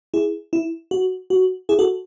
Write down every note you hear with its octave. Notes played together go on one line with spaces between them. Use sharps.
E4 G#4
E4
F#4
F#4
E4 G#4
F#4 A4